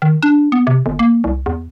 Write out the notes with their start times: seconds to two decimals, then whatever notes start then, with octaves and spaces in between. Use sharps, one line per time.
0.02 D#3
0.23 D4
0.52 B3
0.67 C3
0.86 G1
0.99 A#3
1.24 C2
1.46 E2